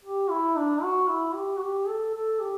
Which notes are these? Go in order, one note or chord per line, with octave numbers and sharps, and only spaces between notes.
G4
E4
D4
F#4
E4
G4
F#4
G4
A4
A4
G4